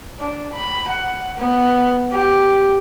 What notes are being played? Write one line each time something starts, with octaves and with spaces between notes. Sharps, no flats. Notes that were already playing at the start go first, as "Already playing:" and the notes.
D4
B5
F#5
B3
G4